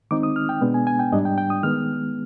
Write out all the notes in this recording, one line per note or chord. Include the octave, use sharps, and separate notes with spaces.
D#3 G#3 C4 D#4 D6
D#6
F6
G5
B2 G#3 B3 D4
G#5
G#5
G5
G#2 G3 D4 D#5
G5
G5
D#6
D#3 G#3 B3 F6